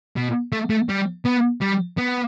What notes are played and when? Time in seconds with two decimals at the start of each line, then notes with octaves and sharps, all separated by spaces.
0.17 B2
0.53 A3
0.70 A3
0.89 G3
1.26 B3
1.61 G3
1.98 B3